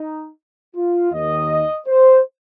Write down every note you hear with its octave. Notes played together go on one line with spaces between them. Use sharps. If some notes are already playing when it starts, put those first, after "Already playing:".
Already playing: D#4
F4
D#2 D#3 D#5
C5